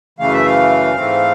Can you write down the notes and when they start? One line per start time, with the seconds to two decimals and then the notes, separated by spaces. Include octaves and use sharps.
0.19 F#2 C#3 E3 A3 F5
0.33 E5
0.46 F5
0.95 G#2 E3 A3 C4